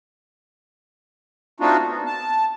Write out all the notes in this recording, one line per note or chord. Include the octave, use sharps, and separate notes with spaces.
A3 C4 D4 D#4 F4 F#4
B3
A5